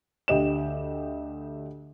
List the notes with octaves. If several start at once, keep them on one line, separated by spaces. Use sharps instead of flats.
D2 G4 D#5 E7